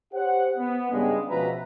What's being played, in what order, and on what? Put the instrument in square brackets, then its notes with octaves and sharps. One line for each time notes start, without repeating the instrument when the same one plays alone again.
[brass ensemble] G4 C5 C#5 F#5
B3
G2 C#3 G3 G#3
C#2 B2 F3 B4 E5 A#5